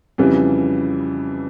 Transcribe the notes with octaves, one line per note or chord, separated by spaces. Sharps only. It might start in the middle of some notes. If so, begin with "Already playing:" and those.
F2 C#3 E3 G3